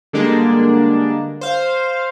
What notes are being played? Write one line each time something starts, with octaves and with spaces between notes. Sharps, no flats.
D3 G3 G#3 A#3 D4
C5 F5